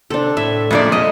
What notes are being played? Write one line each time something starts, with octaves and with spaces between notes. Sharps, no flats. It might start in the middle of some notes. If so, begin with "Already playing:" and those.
C3 D4 A4
A2 E5
F2 A#2 G#3 A3 D4 D5
G#3 A3 D#5 F6